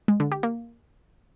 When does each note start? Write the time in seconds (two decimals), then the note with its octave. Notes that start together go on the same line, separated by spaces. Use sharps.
0.08 G#3
0.20 D3
0.32 G4
0.43 A#3